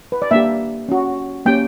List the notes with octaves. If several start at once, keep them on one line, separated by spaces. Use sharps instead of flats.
B4
D5
A#3 D4 G4 E5
C#4 F#4
A#3 C#4 G4 G5